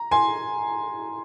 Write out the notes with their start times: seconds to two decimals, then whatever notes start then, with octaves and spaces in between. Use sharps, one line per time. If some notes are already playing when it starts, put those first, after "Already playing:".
Already playing: A#5
0.11 G#5 C6